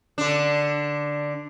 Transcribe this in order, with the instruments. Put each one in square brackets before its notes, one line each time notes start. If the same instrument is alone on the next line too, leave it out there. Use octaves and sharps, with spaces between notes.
[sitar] D3 D4